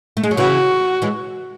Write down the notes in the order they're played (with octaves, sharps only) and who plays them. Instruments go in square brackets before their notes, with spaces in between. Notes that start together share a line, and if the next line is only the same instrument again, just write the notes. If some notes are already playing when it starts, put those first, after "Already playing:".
[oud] A3
G#3
F#3
[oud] C#3 E3 [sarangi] F#4
[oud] E3 G#3